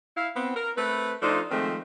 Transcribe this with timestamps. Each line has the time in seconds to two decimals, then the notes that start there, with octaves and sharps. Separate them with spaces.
0.17 E4 F5
0.36 B3 C4
0.56 A#4
0.77 A3 C4 B4
1.22 F3 A3 D4 D#4 F4
1.51 D#3 F3 G#3 A3 C4